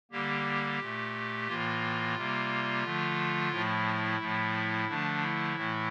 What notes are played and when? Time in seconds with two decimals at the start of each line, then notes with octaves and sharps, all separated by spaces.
0.11 D3 G3 A#3 G4
0.80 A#2 A3
1.47 A2 E3 A#3 F4
2.16 C3 G3 A#3
2.84 D3 F3 A3
3.51 A2 F3 A3 E4
4.19 A2 F3 A3
4.88 D3 F3 A3 D4
5.22 E4
5.56 A2 E3 A3